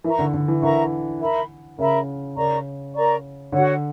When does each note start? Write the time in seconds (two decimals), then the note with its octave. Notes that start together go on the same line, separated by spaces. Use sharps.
0.04 E3 A#4 E5 A#5 C#6
0.19 D3
0.34 D3
0.48 E3
0.62 D3 A#4 E5 A#5 C#6
1.21 A#4 E5 B5
1.78 C#3 A#4 E5 B5
2.36 C#3 A#4 D5 A#5 C#6
2.95 A#4 D5 A#5 C#6
3.52 D3 F#4 C#5 F#5